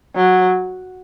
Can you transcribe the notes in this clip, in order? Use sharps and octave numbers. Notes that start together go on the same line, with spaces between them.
F#3